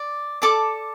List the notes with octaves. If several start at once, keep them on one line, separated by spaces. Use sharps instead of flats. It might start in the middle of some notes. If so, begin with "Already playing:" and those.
Already playing: D5
A4 D5 A5 D6